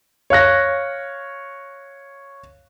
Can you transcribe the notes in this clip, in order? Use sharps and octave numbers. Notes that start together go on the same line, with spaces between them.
C#5 F5 F#6 A#6